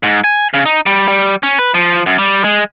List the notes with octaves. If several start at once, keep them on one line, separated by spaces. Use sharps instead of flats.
G#2
G#5
C#3
D#4
G3
G3
C#4
B4
F3
F#2
G3
G#3